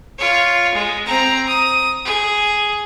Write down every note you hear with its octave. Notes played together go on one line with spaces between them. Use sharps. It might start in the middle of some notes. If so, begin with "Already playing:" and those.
F4 C#5
G#3
C4 A#5
D#6
G#4